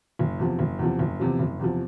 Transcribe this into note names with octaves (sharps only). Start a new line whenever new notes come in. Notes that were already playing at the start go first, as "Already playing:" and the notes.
F#1
E2 C3 F3
F#1
E2 C3 F3
F#1
E2 C3 F3
F#1
E2 C3 F3